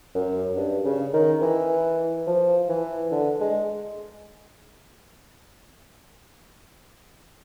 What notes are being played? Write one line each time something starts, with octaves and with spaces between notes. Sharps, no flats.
F#2
G2
C#3
D#3
E3
F3
E3
D3
G#3